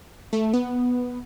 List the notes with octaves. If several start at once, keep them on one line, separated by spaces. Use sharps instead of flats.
A3
B3